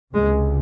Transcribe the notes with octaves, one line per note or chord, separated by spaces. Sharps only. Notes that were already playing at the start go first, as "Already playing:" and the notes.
C#2 C3 G#3